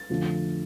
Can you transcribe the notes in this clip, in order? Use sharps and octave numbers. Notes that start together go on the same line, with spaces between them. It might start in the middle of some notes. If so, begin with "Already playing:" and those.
Already playing: A6
F2 D3 F3 A3